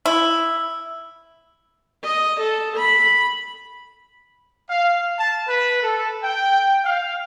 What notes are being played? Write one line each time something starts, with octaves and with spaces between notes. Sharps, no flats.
E4
D#5
A4
B5
F5
A5
B4
A4
G5
F5